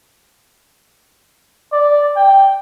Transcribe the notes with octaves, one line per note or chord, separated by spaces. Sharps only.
D5
G5